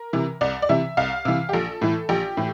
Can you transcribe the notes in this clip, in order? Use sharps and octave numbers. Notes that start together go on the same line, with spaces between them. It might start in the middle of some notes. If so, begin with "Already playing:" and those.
Already playing: A#4
C3 E3
C2 D5
D5
C3 E3 E5
C2 F5
C3 E3
G4
A#1 A4
A2 E3
A#1 G4
A2 E3